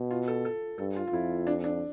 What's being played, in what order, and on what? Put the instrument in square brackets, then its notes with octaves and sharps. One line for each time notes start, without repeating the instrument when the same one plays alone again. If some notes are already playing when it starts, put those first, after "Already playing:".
Already playing: [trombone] B2
[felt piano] F4
A4
A4
[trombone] G2 [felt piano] A4
[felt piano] F4
F4
[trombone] F2 [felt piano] E4
[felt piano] D4
D4